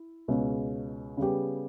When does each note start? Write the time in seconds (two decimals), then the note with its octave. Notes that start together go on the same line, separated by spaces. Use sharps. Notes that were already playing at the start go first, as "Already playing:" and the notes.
Already playing: E4
0.28 C#2 B2 G#3 C#4
1.17 C#3 G3 B3 G4